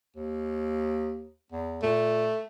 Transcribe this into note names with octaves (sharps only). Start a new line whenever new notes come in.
D#2
E2
A#2 A3